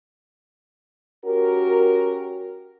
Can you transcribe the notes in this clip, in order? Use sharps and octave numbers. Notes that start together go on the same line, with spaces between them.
C#4 F#4 G4 A#4